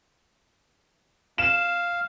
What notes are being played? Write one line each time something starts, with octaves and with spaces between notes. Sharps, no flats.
F5 E7